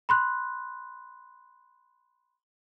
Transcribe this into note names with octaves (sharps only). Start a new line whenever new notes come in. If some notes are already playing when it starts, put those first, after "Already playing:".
B5 C6 F#6